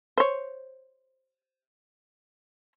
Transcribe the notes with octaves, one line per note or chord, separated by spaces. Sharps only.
C5 C#5